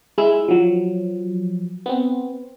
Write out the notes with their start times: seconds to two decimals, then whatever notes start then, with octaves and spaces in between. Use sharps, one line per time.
0.18 G#3 E4 E6
0.48 F3 F#3
1.86 B3 C4